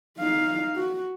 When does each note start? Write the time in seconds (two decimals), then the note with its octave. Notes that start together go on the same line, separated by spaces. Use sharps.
0.18 D#4 F5
0.76 F#4